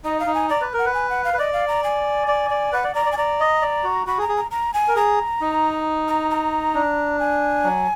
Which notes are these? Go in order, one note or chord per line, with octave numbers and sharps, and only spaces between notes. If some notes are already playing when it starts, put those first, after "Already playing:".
D#4 D#5
F5
D#4
G#5
D5 A#5
B4
A#4
F#5
B4
G#5
F#5
F5
B4
D5 D#5
F5
A#5
G#5
D5
D5
B4 F#5
D5
D5 A#5
D5
G#5
D5 A#5
D#5
D5
F#4
F#4 B5
G#4
A#5
G#4
A#5
A#5
G#5
A#4
G#4 A#5
D#4
A#5
A#5
D4
G#5
F#3